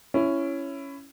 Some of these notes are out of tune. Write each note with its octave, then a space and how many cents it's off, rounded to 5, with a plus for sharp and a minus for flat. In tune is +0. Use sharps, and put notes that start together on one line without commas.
C#4 +0 E4 +15